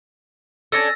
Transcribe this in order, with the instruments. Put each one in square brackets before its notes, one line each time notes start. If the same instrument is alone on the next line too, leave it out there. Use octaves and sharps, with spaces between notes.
[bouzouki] C#4 D4 A4 [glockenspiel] E6 A6 A#6